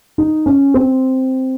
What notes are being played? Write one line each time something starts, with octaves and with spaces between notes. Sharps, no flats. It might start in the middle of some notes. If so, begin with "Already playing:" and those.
D#4
C#4
C4